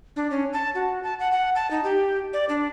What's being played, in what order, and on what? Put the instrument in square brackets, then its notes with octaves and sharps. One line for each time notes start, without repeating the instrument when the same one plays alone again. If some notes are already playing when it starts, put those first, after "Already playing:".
[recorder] D4
C#4
A5
F#4
A5
F#5
F#5
A5
D#4
G4
D5
D4